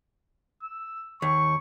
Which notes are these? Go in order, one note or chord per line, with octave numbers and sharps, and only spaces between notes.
E6
D#2 C#6